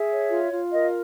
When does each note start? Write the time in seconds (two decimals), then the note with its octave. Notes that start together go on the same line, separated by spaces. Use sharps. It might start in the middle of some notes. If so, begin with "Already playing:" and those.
Already playing: G#4 E5
0.11 C#5
0.30 F4
0.52 F4
0.71 A#4 D#5